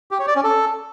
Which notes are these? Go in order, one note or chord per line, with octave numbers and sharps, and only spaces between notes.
G4
C#5
D5
C#4
A4